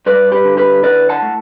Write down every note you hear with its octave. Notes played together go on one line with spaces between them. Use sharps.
G2 B4 D5
G4 B4
D3
G4 B4
E4 B4 D5
F#5 A5
A3